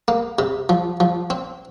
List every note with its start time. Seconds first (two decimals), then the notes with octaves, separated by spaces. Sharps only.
0.08 A#3
0.39 C3
0.69 F3
1.00 F3
1.30 C4